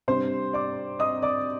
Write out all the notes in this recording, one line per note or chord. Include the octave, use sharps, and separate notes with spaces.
C3 G3 D4 C5 C6
D5 D6
D#5 D#6
D5 D6